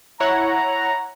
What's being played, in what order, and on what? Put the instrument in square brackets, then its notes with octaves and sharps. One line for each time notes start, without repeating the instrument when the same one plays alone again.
[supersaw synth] E4 C#5 F#5 [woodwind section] A#5